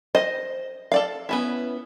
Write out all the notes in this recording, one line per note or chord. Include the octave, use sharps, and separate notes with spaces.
C5 D#5
A4 D5 F5
B3 C#4 E4